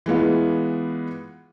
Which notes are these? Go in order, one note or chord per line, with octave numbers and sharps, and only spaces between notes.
E3 G#3 B3 F4